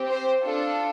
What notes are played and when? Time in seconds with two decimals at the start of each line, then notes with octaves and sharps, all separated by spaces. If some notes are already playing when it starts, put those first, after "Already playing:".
Already playing: C4 G4
0.09 C5
0.43 D4 F4 A4